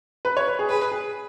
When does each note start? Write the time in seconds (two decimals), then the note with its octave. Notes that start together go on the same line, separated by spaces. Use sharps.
0.25 B4
0.37 C#5
0.47 B4
0.59 G#4
0.69 G#4 B4
0.92 G#4